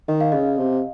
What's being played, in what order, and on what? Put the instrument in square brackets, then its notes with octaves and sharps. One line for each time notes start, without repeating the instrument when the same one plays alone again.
[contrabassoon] D#3 [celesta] D#5
[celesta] F5
[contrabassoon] C#3 [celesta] D#5
[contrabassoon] C3